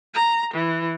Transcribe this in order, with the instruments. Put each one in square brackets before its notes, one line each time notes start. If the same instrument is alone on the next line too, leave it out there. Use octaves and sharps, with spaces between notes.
[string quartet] A#5
E3